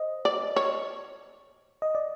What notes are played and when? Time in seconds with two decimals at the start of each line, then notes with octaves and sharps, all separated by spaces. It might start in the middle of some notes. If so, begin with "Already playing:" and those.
Already playing: C5 D#5
0.25 D5
0.56 C#5
1.82 D#5
1.95 D5